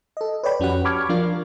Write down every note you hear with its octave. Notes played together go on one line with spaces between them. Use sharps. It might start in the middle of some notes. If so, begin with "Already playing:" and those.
A4 D#5
B4 C#5 D5 G5 B5
F2 C#4 F#4 G4 F#5
A5 B5 C#6 D6 F6 G#6
F3 D4 F4 A#4